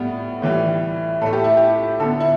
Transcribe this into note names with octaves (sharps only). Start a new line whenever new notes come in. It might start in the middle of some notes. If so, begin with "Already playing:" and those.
Already playing: A2 G3 B3
A2 E3 G3
A2 A3 A4
G4
E4
G4
D3 B3 A4
E4